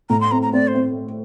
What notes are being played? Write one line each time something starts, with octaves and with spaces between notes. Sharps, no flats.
A2 A#5
C6
C4 A#5
A#5
C4 D5
C5
C4